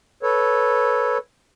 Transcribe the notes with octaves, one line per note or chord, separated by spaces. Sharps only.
A4 B4 C#5